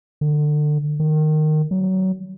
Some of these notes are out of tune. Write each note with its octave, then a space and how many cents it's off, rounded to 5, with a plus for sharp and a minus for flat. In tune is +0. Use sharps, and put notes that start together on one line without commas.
D3 +30
D#3 -15
F#3 +25